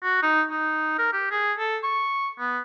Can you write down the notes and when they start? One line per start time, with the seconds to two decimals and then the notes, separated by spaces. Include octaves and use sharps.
0.03 F#4
0.23 D#4
0.50 D#4
0.98 A#4
1.13 G4
1.31 G#4
1.58 A4
1.83 C#6
2.39 B3